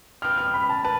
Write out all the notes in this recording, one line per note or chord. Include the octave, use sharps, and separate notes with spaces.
F3 C4 G4 B4 F6
F6
B5
A5
B4 A5